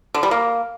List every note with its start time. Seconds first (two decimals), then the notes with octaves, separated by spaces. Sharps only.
0.14 D3
0.23 G3
0.31 A#3